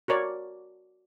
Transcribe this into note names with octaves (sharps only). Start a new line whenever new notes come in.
F#4 A#4 C#5 D5